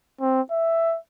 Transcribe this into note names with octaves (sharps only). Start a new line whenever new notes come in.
C4
E5